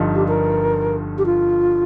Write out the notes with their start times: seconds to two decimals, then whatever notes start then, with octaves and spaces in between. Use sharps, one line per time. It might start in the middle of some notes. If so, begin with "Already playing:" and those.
Already playing: G1 G2 F3 D#4
0.15 G4
0.28 A#4
1.18 G4
1.26 F4